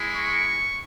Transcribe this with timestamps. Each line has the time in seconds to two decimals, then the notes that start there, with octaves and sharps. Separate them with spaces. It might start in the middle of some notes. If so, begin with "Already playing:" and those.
Already playing: G#3 E4
0.14 C#6